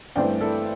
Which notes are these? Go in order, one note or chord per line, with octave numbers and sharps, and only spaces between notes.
G2 E3 A3 C4 D5 G5
E4 A4